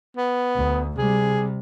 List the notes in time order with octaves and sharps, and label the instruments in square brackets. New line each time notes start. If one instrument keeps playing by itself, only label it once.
[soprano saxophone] B3
[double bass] D2
[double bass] C3 G3 [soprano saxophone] G#4